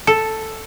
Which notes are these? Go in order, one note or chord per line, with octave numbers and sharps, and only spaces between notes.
A4